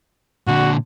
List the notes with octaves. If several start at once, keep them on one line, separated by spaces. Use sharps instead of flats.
A#2 D3 F#4